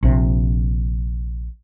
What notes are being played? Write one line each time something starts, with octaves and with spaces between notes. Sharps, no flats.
A#1 C3